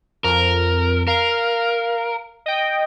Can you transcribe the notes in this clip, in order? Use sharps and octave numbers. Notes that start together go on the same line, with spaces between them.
F2 A#4
A#4 F5
D#5 G5